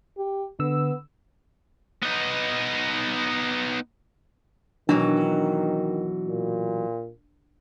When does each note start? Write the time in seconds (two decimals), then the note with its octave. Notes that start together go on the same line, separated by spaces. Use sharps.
0.18 G4
0.59 D3 B3 E6
2.02 B3 D#4
4.89 B2 D#3 E3 F#3 D4
6.29 A#2